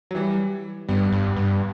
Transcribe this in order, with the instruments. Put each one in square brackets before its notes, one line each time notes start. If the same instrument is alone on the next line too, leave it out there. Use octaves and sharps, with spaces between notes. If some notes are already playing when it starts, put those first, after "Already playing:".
[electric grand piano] F#3
E3 G3
[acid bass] G2 [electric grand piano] G3 B3
[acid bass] G2
G2